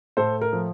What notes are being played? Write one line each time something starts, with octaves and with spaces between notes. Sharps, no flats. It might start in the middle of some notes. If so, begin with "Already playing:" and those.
A2 A4 C5
A#4
F3